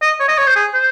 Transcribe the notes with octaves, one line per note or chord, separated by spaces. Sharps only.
D#5
C#5
D#5
C#5
C5
G#4
C5